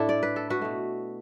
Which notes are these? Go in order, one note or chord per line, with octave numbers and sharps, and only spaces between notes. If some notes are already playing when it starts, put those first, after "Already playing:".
Already playing: A2 A3 D4 E4 A4
D5
B4
A4
F#4 B4
B2 A3